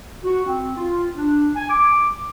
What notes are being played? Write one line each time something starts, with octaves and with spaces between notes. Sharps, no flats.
F#4
C4
F4
D4
G#5
D6